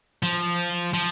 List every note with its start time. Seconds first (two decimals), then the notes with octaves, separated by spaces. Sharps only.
0.23 F3
0.94 F3